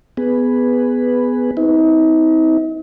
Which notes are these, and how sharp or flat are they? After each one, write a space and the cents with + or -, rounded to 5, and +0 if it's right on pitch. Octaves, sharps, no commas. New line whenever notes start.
B3 +10 G#4 +0 B4 +0
C4 -30 D#4 +45